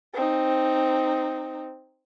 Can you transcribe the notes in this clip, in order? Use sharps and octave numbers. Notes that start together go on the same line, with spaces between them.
C4 D#4